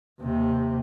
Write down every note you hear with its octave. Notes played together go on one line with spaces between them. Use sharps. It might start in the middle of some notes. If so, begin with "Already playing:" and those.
D#2 C3